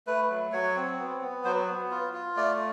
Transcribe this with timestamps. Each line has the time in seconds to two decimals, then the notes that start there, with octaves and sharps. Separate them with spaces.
0.07 A3 B4
0.30 F#3
0.52 F#3 C#5
0.76 C4
0.99 B3
1.21 B3
1.44 F#3 C5
1.68 B3
1.91 F4
2.14 F4
2.37 A3 D5